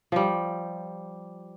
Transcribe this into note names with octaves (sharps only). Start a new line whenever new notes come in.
F3 G3